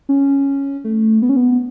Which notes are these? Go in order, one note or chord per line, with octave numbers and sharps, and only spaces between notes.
C#4
A3
B3
C#4
B3